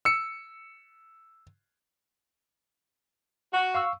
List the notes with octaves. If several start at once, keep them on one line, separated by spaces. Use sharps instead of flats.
E6 C#7
F#4
F5 C#6 E6